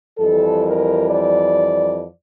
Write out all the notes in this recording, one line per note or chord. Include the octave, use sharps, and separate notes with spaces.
F2 E3 G3 A4
A#4
D5